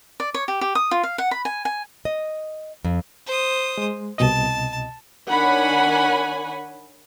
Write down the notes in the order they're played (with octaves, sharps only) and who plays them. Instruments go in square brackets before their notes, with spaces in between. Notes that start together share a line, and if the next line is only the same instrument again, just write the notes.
[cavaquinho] D5
C#5
G4
G4
D#6
F4
F5
F#5
B5
G#5
G#5
[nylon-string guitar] D#5
F2
[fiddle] C5 D#6
[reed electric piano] G#3
[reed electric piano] C2 B2 D#5 [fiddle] A5
[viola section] D#3 D4 C#5 F#5 G#5 B5